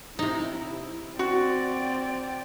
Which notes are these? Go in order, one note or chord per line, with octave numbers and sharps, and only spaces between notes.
C3 D#4 E4
C4 F#4 D5